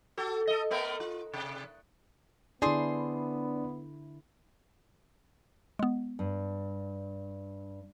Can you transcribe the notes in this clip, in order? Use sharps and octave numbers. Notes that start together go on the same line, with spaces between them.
F#4 A4
A4 D#5
A3 B3 A#4
F4
C3
D3 B3 D4 E4 G#4 C5 D5 C6
G#3 B3
G2